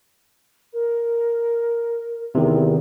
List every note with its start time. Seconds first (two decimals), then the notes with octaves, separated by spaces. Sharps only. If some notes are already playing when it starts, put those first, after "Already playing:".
0.73 A#4
2.35 E2 C3 D#3